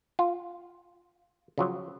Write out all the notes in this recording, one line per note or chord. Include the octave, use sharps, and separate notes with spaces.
F4
C#3 F3 F#3